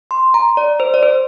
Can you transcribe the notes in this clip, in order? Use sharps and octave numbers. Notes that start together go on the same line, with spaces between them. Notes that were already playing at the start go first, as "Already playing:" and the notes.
C6
A#5
D5
C5
D5
C5